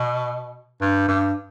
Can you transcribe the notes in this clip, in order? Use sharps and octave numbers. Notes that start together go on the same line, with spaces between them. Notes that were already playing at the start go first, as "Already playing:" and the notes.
Already playing: B2
G2
G2